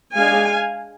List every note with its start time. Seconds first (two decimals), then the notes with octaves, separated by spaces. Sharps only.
0.16 G#3 D4 F5 G#5